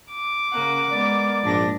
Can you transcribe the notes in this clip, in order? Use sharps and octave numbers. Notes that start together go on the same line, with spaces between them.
D6
C#3 A#3 F#5
G#3 B3 A#4 D5
A#1 G#2 D4 A#6